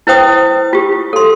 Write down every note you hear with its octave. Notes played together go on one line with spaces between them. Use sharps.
E4 B4 C5 G5 D#6
F4 G4
A4 C6